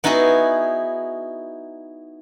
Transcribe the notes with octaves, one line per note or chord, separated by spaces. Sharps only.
B3 D#4 E4 F#4 G#4